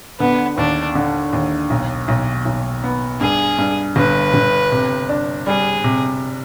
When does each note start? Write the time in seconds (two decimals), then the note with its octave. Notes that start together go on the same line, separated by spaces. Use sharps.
0.20 D3 B3
0.58 D#2 D4
0.95 D3
1.33 D#2
1.70 B1
2.08 B1
2.45 B1
2.84 B3
3.21 G2 G#4
3.58 G2
3.96 G1 B4
4.34 G1
4.72 C3
5.09 D4
5.47 G3 G#4
5.84 C3